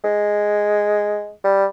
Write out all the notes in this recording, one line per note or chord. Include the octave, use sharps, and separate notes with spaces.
G#3
G3